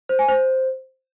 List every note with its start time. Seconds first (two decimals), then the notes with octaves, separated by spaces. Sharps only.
0.09 C5
0.19 G#5
0.29 C5